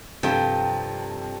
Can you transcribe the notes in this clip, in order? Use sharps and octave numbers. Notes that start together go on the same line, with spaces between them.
G2 C3 F3 A4 G5